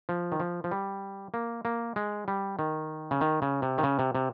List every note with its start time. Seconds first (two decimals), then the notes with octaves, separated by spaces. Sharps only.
0.09 F3
0.32 D#3
0.40 F3
0.64 F3
0.71 G3
1.34 A#3
1.65 A#3
1.96 G#3
2.28 G3
2.59 D#3
3.11 C#3
3.21 D#3
3.42 C#3
3.62 C3
3.78 D#3
3.83 C#3
3.99 C3
4.15 C3